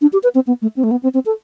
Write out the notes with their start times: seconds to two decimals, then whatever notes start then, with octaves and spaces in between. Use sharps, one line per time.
0.01 D4
0.13 G4
0.23 B4
0.35 C4
0.47 B3
0.62 A3
0.76 C4
0.83 A3
0.91 B3
1.03 C4
1.14 C4
1.26 A4